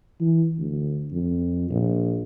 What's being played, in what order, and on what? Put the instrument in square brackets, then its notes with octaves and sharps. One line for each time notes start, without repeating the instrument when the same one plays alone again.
[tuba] E3
D2
F2
A#1